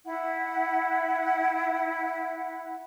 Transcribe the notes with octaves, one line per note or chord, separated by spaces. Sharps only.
E4 F#5